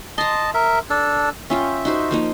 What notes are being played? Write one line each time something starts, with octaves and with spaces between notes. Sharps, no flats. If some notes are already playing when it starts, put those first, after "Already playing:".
D#5 A5 A#5 C6
A#4 E5
D4 A4
C#4 F4 E5 G5
D#4 F#4 C5
F3 A#3 D#4